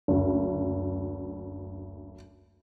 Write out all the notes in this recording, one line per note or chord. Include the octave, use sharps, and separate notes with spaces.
F#1 D2